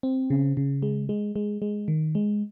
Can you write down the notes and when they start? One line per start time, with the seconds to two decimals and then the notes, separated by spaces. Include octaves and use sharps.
0.03 C4
0.30 C#3
0.57 C#3
0.82 G#3
1.09 G#3
1.36 G#3
1.62 G#3
1.88 D#3
2.15 G#3